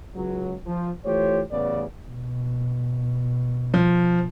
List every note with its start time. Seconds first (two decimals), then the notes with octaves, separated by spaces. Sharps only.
0.15 C#2 F#3
0.66 F3
1.05 E3 A3 F4 G4 C5 C#5
1.52 A1 C#3 B3 D5
2.08 B2
3.74 F3